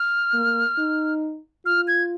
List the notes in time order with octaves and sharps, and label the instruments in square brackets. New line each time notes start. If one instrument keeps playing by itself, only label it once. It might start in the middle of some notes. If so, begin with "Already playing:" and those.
Already playing: [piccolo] F6
[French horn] A#3
D#4
[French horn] F4 [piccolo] F6
[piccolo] G#6